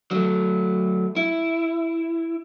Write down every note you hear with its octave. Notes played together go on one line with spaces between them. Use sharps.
F#3 A3
E4